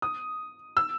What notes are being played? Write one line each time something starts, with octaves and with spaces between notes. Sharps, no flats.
D#6
E6